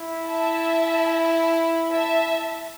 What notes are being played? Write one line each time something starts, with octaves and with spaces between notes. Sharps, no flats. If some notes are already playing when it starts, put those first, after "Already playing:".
Already playing: E4
E5 A5
E5 A5